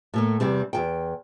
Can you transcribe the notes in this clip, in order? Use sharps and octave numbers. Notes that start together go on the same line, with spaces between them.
A2 A3 A#3
E2 C3 G3 C4
E2 G#2 G5